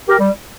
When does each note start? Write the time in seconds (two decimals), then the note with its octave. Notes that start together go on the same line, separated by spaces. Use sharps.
0.08 G4 A#4
0.19 G3